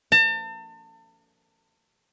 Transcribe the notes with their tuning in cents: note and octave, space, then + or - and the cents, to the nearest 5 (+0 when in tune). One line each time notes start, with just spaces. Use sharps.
A5 +40